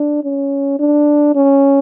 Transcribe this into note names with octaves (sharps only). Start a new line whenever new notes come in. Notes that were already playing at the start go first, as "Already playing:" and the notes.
Already playing: D4
C#4
D4
C#4